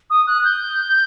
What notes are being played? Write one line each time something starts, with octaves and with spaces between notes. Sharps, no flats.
D#6
F#6
G6